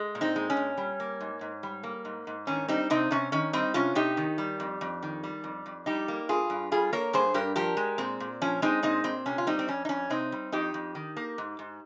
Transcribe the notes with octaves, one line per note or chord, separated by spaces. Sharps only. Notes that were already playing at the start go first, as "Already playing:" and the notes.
Already playing: G#3
A#2
C4 D#4
G#3
C#4
A#2
G3
A#3
G#2
G#2
G3
A#3
G#2
G#2
D#3 C#4
G3 C4 D#4
C3 C4 D#4
C3 C#4
D#3 C#4
G3 C4 D#4
C3 C#4 F4
C3 D#4 G4
D#3
G3
F2
F2
D#3
G3
F2
F2
G3 D#4 G4
A#3
G2 F4 G#4
G2
G3 F4 G#4
A#3 A#4 C#5
G2 G#4 C5
G2 G4 A#4
F3 G4 A#4
G#3
A#2 C4
A#2
F3 C#4
G#3 C4 D#4
A#2 C4 D#4
A#2 C4
C3 C#4
F4
G3 C4 D#4
C4
F2 C#4
D#4
F2 C#4
C3 C4 D#4
G3
F2 D#4 G4
F2
D#3
A#3
G#2
G#2